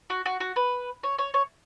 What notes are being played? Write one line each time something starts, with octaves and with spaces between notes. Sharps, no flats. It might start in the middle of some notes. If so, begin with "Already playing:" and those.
F#4
F#4
F#4
B4
C#5
C#5
C#5